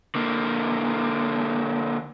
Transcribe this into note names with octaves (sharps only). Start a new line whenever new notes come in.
D3 A#3